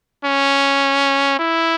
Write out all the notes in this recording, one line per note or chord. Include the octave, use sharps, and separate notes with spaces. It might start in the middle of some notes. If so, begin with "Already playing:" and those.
C#4
E4